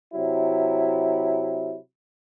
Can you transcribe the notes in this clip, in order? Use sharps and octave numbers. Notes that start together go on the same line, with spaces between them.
C3 F#3 E4